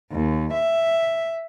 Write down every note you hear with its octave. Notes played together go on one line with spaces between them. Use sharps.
D#2
E5